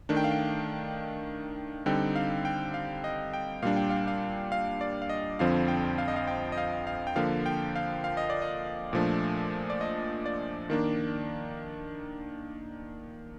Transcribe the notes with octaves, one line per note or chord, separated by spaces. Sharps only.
D#3 A3 D4
G5
F5
G5
D3 G3 C4 D#4 G5
F5
G5
F5
D#5
G5
A#2 G3 D4 F5
G5
F5
F5
F5
D5
F5
D#5
F2 D3 F3 C4 F5
G5
F5
D#5
F5
G5
D#5
F5
F5
G5
D3 F3 A#3 F5
G5
F5
F5
D#5
D5
D#5
A#2 F3 A3 D4
D5
D#5
D5
D#3 A#3 D4